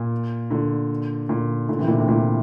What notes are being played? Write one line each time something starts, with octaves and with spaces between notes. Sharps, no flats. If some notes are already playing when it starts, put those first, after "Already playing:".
Already playing: A#2
A#2 D3
A#2 D3
A#2 D3
C3 E3
A#2 D3
A2 C3
A#2